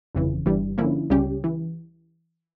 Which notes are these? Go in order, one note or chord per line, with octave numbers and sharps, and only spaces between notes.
G1 F2 C#3 E3
G1 G2 E3 G3
D3 F3 A#3 C#4 E4
C#2 C#3 G3 C#4 G4
E3